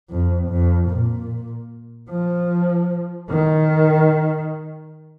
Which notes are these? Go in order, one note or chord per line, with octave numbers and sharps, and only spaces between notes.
F2
F2
A#2
F3
D#3